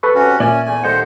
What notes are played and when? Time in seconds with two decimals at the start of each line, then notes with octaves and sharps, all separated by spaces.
0.03 A4 B4 C#6
0.15 C3 C#4 F#4
0.40 A#2 C#4 D5 E5 G#5
0.66 E2 A3 G#5
0.84 D#2 A4 C5 D#5 F#5